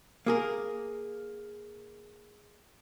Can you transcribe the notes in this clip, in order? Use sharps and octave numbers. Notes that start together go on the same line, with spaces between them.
A#3 G#4 A#4